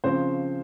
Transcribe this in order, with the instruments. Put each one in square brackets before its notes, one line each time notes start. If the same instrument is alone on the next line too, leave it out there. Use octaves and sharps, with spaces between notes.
[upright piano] C#3 F3 C4 C5